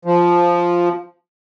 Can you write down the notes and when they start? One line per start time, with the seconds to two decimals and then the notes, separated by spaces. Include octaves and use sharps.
0.05 F3